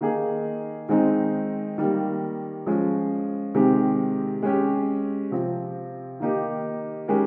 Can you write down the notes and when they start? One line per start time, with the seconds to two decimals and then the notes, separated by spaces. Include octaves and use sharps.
0.01 D#3 A#3 D#4 G#4
0.89 D#3 G#3 C4 D#4
1.78 D#3 G3 A#3
2.66 F3 G#3 C#4
3.54 C3 D#3 G#3 C4 G4
4.43 G#3 C#4 G4
5.31 C3 F3 C4
6.20 D#3 A#3 D#4 G4
7.08 D#3 G#3 C#4 G4 A#4